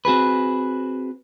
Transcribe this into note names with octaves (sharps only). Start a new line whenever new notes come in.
C4 F#4 G#4 B4